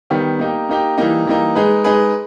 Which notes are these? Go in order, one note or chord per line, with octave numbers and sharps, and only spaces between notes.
D#3 G3 B3
A#3 D#4 G4
A#3 D#4 G4
E3 G3 A#3 D#4
E3 G3 A#3 D#4
G#3 D#4 G#4 B4
G#3 D#4 G#4 B4